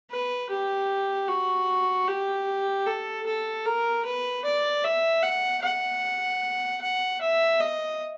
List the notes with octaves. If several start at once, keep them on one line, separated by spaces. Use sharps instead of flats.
B4
G4
F#4
G4
A4
A4
A#4
B4
D5
E5
F#5
F#5
F#5
E5
D#5